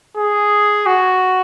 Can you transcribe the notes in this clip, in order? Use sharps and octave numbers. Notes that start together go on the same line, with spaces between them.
G#4
F#4